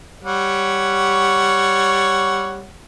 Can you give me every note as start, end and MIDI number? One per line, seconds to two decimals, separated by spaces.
0.24 2.68 55
0.24 2.68 73
0.24 2.68 78